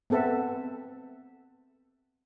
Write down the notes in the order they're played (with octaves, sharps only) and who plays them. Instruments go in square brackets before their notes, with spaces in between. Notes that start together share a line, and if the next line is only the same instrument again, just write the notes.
[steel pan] B3 C4 A4 B4 E5